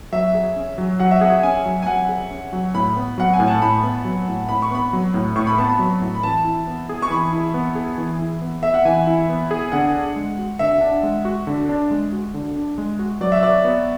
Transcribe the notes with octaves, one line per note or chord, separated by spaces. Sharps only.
F#3 E5
G#4
C#4
F#3
F#3 F#5
E5
G#4 F#5
C#4 G#5
F#3
G#5
F#3 F#5
G#4
C#4
F#3
A2 B5
B3
F#3 F#5
G#5
A2
A5
A2 B5
B3
F#3
A2
A2 B5
C#6
B3 B5
F#3
A2
A2 C#6
B5
B3 A5
B5
F#3
A2
B5
E3 A5
E4
B3
G#4
C#6
E3 B5
E4
B3
G#4
E3
E4
B3
G#4 E5
F#5
E3 G#5
E4
B3
G#4
D3 F#5
D4
G#3
F#4
D3 E5
D4
G#3
F#4
D3
D4
G#3
F#4
D3
D4
G#3
F#4
F#3 D5
E5
F#4 D5
B3